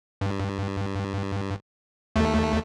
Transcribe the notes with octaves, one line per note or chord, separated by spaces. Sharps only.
G2
D#2 A3